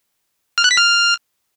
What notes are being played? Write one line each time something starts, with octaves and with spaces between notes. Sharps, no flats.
F6
F#6
B6
F6